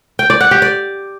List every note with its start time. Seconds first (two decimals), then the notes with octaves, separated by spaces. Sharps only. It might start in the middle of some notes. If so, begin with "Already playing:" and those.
0.19 G5
0.30 D5
0.40 F#5
0.51 G4
0.62 D5